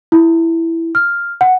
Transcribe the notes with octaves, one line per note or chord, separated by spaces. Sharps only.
E4
F6
F#5